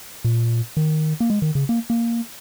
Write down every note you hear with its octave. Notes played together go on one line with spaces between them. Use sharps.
A#2
D#3
A#3
G#3
D#3
C#3
A#3
A#3